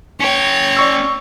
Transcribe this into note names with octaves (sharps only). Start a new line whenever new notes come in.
C#4 C#5 G5
D5 C#6 E6